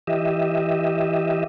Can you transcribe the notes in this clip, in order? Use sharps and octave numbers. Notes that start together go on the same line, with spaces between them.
E3 G4 D#5 E5